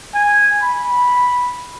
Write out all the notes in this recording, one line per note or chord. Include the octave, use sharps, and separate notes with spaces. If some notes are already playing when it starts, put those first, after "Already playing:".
G#5
B5